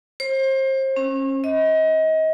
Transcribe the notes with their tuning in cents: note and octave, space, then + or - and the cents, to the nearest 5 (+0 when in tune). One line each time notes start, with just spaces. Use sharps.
C5 +30
C#4 -35
D#5 +30